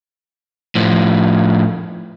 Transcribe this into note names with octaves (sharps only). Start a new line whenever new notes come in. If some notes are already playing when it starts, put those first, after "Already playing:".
A2 F3